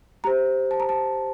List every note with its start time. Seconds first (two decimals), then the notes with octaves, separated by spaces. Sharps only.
0.24 G4 C5 A#5
0.71 A5
0.80 A#5
0.89 A5